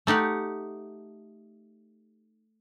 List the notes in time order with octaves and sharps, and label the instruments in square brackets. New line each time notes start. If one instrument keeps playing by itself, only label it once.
[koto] A3 D#4 G4 F#5